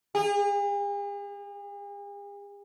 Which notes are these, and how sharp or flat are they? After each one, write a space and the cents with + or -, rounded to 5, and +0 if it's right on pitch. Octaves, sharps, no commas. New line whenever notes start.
G#4 -45